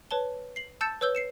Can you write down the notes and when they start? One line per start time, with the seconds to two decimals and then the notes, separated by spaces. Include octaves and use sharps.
0.11 B4 C#5 A5 G7
0.56 C7 F#7
0.81 A5 E6 G6 A6 C#7 E7
1.01 B4 C#5 E6 G6 G7
1.15 C7 C#7 E7